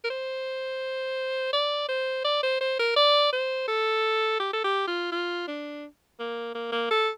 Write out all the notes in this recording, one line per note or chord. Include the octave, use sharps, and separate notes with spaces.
A#4
C5
D5
C5
D5
C5
C5
A#4
D5
C5
A4
G4
A4
G4
F4
F4
D4
A#3
A#3
A#3
A4